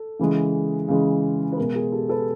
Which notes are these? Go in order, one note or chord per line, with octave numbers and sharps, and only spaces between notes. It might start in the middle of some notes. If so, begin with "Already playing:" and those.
Already playing: A4
C#3 E3 G#3
C#3 E3 G#3
B4
B2 G#3 G#4 A#4
G#4 A#4
G4 A4
A4 B4